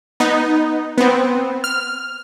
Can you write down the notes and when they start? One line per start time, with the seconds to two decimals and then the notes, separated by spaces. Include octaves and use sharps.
0.20 B3 D#4
0.98 B3 C4
1.64 F6